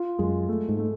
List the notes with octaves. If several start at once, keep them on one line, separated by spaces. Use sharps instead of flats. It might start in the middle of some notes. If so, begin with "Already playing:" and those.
Already playing: F4
F#2 G#3
A3
G#2
A3